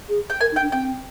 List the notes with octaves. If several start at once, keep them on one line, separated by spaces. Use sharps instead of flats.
G#4
G5
A#4 G#5
D#4
G5
D4
C4 G5